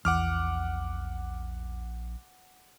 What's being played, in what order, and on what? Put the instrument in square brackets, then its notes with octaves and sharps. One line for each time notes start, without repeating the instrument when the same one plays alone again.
[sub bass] A#1 [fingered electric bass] E2 [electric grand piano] F#5 D6 F6